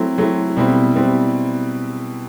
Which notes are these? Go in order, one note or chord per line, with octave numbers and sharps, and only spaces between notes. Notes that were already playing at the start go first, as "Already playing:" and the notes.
Already playing: F#3 A3 C4 E4
F#3 A3 C4 E4
B2 G3 C4 E4
B2 G3 C4 E4